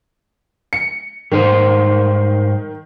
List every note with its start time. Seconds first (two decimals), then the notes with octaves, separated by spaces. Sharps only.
0.73 C#7
1.32 G#2 D#3 G3 C5